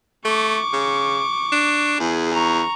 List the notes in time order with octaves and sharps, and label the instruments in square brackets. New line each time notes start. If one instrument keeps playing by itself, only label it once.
[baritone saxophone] A3 [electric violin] C#6 D6
[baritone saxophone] C#3
D4
[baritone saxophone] E2 [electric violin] G#4
[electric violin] A#5 C#6